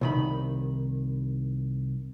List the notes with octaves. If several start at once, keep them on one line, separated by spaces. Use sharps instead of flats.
C2 D#3 B5